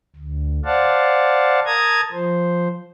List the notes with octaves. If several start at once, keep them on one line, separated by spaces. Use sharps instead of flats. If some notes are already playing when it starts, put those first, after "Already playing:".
D2
C5 D5 F5 F#5 A5
A#4 A5 A#5 D#6 G#6
F3 C5